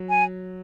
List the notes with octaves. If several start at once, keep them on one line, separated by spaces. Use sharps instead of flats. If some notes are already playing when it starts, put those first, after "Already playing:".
Already playing: F#3
G#5